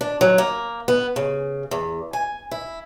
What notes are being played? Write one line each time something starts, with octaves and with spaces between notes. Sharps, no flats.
D4
F#3
A#3
B3
C#3
E2
G#5
E4